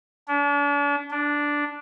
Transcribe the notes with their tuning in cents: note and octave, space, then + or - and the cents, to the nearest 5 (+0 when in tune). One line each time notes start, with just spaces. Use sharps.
D4 -40
D4 -5